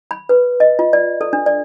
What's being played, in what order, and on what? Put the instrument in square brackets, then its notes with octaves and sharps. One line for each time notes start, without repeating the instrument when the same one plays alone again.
[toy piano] B5
B4
D#5
F4
D5
A4
D4
D5